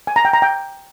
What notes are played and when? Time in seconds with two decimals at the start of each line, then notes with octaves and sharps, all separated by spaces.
0.07 G#5
0.16 A#5
0.25 G5
0.33 A#5
0.42 G5